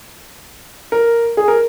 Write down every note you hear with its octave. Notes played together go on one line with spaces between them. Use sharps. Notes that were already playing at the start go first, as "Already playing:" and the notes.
A#4
G#4
A#4